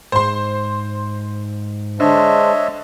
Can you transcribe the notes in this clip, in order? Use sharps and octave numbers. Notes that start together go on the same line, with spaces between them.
G#2 C5 C6
D3 G#3 D4 C5 C#5 D#5 E5